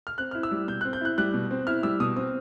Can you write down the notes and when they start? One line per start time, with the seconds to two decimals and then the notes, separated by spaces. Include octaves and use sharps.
0.07 F6
0.18 C4 F#6
0.31 F6
0.35 E4
0.43 E6
0.51 G3
0.67 B2 G6
0.81 F#6
0.85 C4
0.93 G6
1.01 E4 F#6
1.18 G3 F#6
1.34 B2
1.51 C4
1.67 E4 F6
1.83 G3 E6
2.00 B2 D#6
2.16 C4 D#6